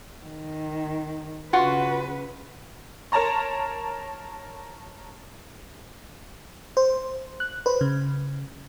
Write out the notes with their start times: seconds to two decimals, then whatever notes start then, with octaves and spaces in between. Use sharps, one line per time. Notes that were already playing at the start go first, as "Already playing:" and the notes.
0.25 D#3
1.53 C#3 F4 F#4 B4 F#5
3.12 A#4 C#5 A5 A#5 C6
6.77 C5
7.40 F#6
7.66 B4 C5
7.81 C#3